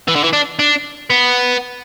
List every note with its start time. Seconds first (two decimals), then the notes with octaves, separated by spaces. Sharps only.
0.08 E3
0.16 D3
0.24 E3
0.33 D4
0.59 D4
1.10 B3